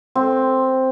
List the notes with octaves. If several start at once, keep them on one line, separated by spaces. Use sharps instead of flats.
C4